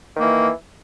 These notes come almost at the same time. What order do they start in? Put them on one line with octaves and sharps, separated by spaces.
D#3 A#3 E3